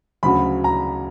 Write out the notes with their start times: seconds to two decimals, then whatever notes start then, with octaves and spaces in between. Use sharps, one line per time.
0.23 D2 C#3 F#3 B5
0.64 A#5